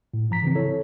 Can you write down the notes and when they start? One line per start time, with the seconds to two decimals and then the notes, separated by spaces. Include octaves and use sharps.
0.14 A2
0.30 G#2 F3 A#5 B6
0.42 C#3 E3 C4
0.55 E4 A4 C#5